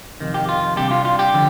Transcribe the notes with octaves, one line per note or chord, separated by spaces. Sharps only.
F2 C3 D#3
G4
F4
C3 G3 D4 G4
F4
F4
G4
D3 F3